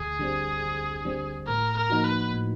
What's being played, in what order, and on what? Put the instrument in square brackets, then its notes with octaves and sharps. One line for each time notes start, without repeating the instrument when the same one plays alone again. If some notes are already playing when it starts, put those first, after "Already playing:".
Already playing: [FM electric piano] D2 [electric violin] G#4
[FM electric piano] D3 G3 C4
D2
D3 G3 C4
[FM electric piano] A2 [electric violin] A#4
[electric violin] A#4
[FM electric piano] F3 A#3 D#4 F#4
[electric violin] B4
[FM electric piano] A2